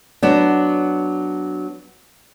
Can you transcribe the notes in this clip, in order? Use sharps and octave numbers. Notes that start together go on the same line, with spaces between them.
F#3 B3 D4